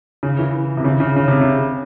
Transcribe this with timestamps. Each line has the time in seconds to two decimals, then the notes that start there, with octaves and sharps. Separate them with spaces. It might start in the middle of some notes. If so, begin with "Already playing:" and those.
0.23 C#3
0.39 E3
0.77 C3
0.84 C#3
1.00 C#3
1.16 C#3
1.28 C3
1.41 C#3